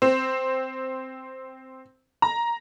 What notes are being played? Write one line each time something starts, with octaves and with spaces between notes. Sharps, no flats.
C4
A#5